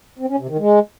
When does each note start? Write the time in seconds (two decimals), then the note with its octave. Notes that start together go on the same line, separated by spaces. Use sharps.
0.19 C4
0.29 C#4
0.39 C3
0.49 D#3
0.59 G#3